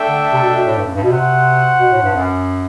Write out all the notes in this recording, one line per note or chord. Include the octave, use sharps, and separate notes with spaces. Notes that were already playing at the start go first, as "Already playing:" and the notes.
Already playing: A3 D4 A4 E5 G5
D3
C3
B2
B2
A2
G2
F#2
G2
B2
C3 F#4 C5 F#5
B2
A2
G2
F#2